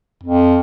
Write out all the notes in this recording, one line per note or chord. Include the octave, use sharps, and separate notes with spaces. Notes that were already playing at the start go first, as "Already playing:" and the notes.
F2